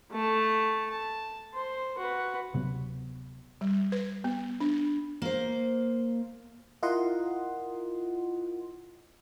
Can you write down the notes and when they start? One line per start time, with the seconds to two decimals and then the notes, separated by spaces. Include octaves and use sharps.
0.12 A3 A5
0.90 A5
1.54 C5
1.98 F#4 B4
2.53 D1 C3 F#3 B3
3.61 G3
3.92 B4
4.24 B3
4.60 D4
5.22 A#3 C5
6.83 E4 F4 A#4 D#5 F#5 C6